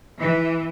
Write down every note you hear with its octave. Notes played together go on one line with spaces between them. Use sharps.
E3